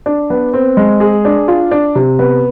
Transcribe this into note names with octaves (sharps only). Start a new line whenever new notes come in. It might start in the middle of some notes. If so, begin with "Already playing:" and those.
D4
B3
C4
G#3
G#4
D4
F4
D4
C3
B3